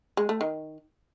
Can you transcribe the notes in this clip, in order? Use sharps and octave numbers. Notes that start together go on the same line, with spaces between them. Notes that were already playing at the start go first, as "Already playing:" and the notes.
G#3
A3
D#3